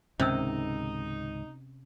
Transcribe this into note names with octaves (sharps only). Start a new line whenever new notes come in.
C#2 G#2 C3 D#3 C#4 D#4 E6